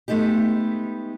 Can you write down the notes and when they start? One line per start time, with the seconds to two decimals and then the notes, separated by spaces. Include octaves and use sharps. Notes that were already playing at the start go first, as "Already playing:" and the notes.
0.08 G#3 A3 B3 D#4 G4